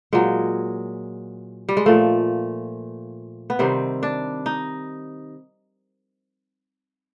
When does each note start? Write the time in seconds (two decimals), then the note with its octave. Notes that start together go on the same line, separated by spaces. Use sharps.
0.13 A#2 F#3 G#3
1.69 G3
1.77 G#3
1.86 A#2 F3 A3
3.50 B3
3.59 C3 D#3 G3 C4
4.03 D4
4.46 D#4